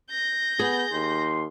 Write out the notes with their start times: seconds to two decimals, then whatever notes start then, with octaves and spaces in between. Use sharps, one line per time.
0.10 G6 A#6
0.59 B3 G#4
0.93 D#2 C6